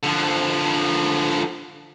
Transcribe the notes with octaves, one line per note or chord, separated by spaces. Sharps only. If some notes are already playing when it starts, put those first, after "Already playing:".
D3 F3